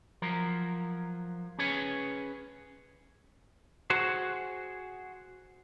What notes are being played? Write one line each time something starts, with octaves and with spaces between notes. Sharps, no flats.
F3 F#3 A#4
C#4 G#4 B4 C#5 G#5
F#4 G#4 C5